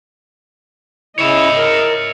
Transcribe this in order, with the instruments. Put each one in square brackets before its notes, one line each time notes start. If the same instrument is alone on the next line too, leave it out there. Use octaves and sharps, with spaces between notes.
[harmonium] C#3 E4 [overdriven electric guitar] C#5 E5 [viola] D#5
[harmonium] A#4